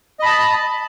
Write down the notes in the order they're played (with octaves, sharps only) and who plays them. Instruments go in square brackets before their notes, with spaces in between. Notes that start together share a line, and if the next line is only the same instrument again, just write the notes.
[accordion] D#5
B5
A5